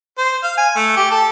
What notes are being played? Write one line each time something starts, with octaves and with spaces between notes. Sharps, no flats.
C5
F5
G#5
A3
G4
A4